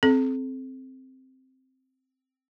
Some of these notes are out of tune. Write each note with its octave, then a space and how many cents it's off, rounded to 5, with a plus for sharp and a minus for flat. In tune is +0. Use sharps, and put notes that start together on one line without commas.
C4 +0 A4 -35